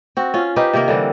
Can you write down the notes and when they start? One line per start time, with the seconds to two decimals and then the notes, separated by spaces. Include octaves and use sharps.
0.17 C4 F#4
0.34 C#4 F4
0.56 D#4 G4 B4 C5
0.73 C3 D#3 A#3 A#4
0.88 D3 E3 G3 C4